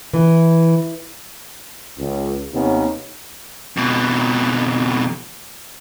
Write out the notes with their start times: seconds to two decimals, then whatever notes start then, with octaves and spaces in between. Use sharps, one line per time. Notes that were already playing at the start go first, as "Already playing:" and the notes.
0.14 E3
1.97 C#2
2.52 D#2 C3 D#3 B3 C#4
3.77 F2 B2